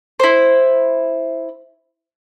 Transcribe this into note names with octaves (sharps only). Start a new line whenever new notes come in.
E4 C5